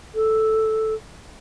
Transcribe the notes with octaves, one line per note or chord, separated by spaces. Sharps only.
A4